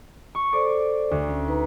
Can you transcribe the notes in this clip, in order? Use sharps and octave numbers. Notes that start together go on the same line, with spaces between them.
C#6
A4 C5 D5 D6
D2
C#4
D#4 B4 A#5